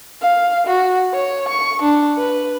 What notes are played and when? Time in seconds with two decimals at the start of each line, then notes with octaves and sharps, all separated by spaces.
0.22 F5
0.67 F#4
1.14 C#5
1.49 C#6
1.82 D4
2.18 B4